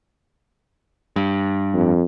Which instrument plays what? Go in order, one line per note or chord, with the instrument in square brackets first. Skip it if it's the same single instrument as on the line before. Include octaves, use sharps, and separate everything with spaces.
[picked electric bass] G2
[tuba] F2